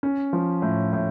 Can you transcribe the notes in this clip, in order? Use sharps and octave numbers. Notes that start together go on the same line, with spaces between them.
C#4
F3
A2
A2